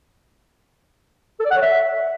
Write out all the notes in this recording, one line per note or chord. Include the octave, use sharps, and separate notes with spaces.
A4
D5
F#5
C#5
E5